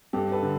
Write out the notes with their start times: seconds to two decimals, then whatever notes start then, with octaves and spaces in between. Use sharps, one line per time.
0.13 G2 G4 A4
0.32 A4 B4
0.43 D3